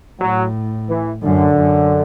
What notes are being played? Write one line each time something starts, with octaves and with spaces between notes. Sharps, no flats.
A2 F#3
E3
F#2 D3
F#2